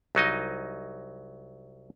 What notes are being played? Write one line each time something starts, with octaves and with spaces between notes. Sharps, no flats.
C2 F#3 D#4 D#5